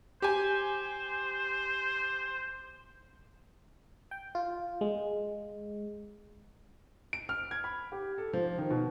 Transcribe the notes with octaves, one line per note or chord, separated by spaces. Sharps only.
G4 C5 G#5
G5
F4
G#3
D7
F6
G#6
B5
G4
A4
F3
D#3
B2